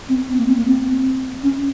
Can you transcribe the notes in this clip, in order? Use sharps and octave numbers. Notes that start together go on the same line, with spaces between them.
C4
C4
A#3
C4
A#3
C4
C#4